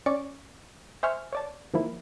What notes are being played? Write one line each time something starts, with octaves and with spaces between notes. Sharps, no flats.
C#4 D5 C#6 D7
C5 E5 G#5 C#6 F6
C#5 D5 A5
D#3 F3 A#3 E4